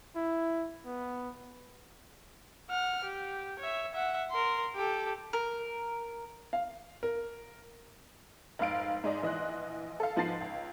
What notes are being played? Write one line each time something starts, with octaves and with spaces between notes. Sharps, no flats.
E4
B3
F#5 F6
G4
C#5 E5
E5 F#5
A#4 C6
G4 A4
A#4
F5
A#4
F1 G#2 F5 D7
G#2 G#3 D5 D#5
A#1 E3 D#5 C6 F#6
A4 F5
G#2 F3 B3 A5 A6 C7
C#2